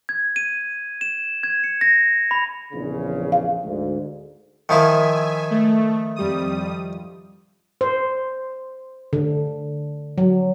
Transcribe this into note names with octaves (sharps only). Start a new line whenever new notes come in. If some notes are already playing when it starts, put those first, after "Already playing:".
G#6
D#7
E7
G#6
C#7
A#6
B5
A#1 E2 C#3
F5
D2 G#2
D#3 F3 E4 E5 G#5
A3
F2 G3 D#6
C5
D3
F#3